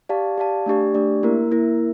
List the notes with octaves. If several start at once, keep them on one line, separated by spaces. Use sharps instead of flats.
G4 D5 F5 A5
G4 D5 F5 A5
A3 D4 G4 D5
A3 D4 G4 D5
A#3 E4 A#4
A#3 E4 A#4